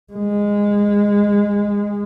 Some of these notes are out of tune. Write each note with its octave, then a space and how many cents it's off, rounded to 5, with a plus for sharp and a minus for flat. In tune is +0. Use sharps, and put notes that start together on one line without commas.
G#3 -20